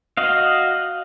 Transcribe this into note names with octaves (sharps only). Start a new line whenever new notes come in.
F#4 D#5 F5